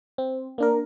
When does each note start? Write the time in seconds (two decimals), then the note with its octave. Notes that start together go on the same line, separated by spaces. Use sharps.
0.18 C4
0.58 A#3 D4 A#4